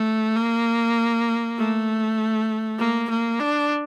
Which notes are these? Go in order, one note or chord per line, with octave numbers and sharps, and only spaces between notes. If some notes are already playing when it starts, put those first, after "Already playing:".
Already playing: A3
A#3
A3
A#3
A#3
D4